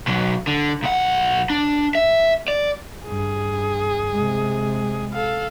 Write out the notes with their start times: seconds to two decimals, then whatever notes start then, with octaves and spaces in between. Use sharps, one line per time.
0.08 B2 F#3
0.48 D3
0.83 B1 F#5
1.50 D4
1.95 E5
2.48 D5
3.07 G2 G#4
4.12 C3 G#3
5.13 A4 F5